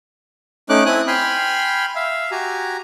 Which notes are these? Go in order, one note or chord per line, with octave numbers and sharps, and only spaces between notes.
A3 C#4 D#4 D6 F#6
C4 E4 G#5 D#6 F#6
G5 G#5 B5 C6 F6
E5 F5
F#4 G4 G#5 A#5